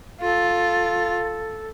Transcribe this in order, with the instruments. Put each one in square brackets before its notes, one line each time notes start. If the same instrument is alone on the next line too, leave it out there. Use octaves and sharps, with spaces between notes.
[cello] F4 [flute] A4